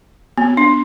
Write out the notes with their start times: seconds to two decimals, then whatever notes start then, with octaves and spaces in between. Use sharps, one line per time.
0.38 B3
0.57 D4